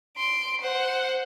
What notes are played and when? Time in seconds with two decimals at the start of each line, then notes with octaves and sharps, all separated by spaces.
0.17 C6 D7
0.61 C5 F#5